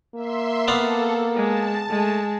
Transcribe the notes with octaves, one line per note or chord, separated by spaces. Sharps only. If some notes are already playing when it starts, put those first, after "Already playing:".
A#3 E5 C6
B3 A4 D5 F5
G#3 A5
G#3 A3